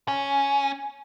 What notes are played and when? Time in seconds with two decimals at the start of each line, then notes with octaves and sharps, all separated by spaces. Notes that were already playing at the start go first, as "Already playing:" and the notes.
0.08 C#4